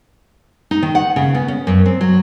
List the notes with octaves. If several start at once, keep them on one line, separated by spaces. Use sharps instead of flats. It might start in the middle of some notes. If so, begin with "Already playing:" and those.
D#4
D#3
F#5
C#3
B3
C#4
F#2
C4
F#3